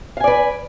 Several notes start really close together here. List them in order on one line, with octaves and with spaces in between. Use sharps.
F5 G#5 D5 B4